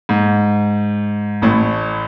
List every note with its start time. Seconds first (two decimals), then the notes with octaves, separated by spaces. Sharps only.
0.09 G#2
1.42 A1 A2